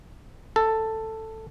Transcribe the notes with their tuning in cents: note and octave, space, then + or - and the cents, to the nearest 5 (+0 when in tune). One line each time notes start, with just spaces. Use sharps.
A4 +10